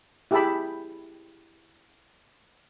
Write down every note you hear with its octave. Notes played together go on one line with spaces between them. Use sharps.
E4 G4 G#4 E5 A5 B5